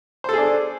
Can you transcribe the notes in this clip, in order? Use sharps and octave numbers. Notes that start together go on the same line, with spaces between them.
D4 G#4 A4 C5